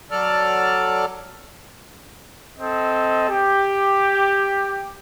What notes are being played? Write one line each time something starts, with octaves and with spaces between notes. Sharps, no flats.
F#3 A4 D5 A5 F6
C4 A4 D#5
G4